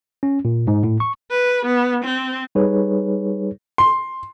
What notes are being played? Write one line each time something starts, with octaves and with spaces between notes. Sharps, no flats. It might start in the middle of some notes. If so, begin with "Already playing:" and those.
C#4
A#2
G#2
A2
C#6
B4
B3
C4
G3 D#4 G#4 B4 C#5
C6